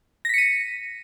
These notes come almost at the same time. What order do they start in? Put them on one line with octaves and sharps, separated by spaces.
A#6 B6 C#7 D#7